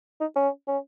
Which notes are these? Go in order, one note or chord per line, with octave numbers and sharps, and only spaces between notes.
D#4
C#4
C#4